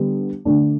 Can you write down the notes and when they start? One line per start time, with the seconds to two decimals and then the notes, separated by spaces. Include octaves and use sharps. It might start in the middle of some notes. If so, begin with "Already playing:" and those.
Already playing: D3 G3 B3
0.45 D3 A3 D4